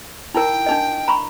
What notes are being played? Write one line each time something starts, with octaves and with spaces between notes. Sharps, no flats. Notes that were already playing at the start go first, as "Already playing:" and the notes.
D#4 E4 A#4 G5
D4 D#4 D#5
A#5 B5 C#6